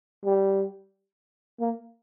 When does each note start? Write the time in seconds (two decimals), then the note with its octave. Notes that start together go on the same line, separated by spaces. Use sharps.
0.25 G3
1.60 A#3